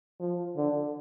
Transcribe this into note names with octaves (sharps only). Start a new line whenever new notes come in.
F3
D3